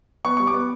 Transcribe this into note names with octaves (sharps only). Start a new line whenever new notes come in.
B3 C#6
G3 C#6
D6
B3